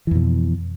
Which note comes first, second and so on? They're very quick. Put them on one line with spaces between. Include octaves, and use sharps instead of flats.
E3 F2 B2